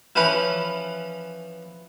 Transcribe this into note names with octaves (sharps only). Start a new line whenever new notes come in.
E3 F3 C#4 E4 B4